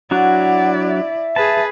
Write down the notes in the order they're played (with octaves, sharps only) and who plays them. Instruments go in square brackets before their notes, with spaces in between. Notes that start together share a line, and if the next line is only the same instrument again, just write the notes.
[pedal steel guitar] F#3 D4 F#4 [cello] E4 D5 [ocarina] F#5
[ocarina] E5
[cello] G#4 B4 [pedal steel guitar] A5